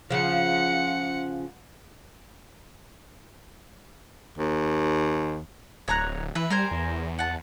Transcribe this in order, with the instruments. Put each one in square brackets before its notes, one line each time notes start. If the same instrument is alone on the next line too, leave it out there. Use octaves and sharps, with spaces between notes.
[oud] C#3 F3 [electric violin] F#5 C#7
[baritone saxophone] D#2
[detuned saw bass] D1 [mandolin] C#5 A#5 F#6
[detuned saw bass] E3 [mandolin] B4 E5
[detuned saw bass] G3 [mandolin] A#4 C5 G#5
[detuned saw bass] E2
[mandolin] F#5 A5